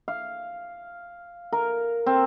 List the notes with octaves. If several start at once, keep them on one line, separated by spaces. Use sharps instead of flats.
F5
A#4
C4